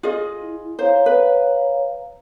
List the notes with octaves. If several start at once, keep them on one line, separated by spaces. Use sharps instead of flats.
F4 G#4 D#5
E4
C5 C#5 F5 A#5
B4